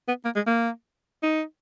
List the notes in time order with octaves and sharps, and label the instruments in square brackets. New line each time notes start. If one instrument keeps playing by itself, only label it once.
[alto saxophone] B3
A#3
G#3
A#3
D#4